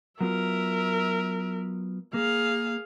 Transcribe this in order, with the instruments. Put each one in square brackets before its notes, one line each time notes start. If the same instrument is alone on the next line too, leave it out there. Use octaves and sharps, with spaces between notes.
[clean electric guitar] F#3 B3 F4 [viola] A#4 E5
[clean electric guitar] A#3 [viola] G#4 F5